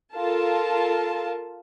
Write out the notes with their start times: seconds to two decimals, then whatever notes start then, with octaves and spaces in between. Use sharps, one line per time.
0.15 F4 A4 A#4 A5